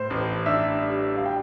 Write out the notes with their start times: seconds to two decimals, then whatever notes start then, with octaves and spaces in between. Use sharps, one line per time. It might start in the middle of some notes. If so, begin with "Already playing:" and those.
Already playing: A2 C5
0.10 A1
0.46 D4 E5
0.81 G3
1.16 G3 F5
1.26 G5